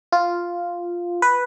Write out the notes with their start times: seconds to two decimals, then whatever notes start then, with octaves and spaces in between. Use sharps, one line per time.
0.12 F4
1.22 B4